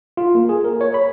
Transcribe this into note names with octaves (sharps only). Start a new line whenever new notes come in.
F4
A#3
G#4
A#4
C#5
B5